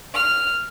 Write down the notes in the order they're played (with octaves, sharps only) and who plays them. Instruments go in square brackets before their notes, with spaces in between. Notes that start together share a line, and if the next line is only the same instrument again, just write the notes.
[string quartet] F6